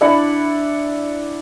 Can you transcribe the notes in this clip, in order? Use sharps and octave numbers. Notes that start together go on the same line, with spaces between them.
D4 E4 D5 F#5